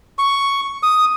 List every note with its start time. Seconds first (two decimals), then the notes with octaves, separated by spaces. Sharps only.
0.19 C#6
0.83 D#6